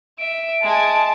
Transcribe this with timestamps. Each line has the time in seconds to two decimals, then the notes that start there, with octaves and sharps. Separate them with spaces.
0.18 E5 D7
0.63 G#3 G#5 A5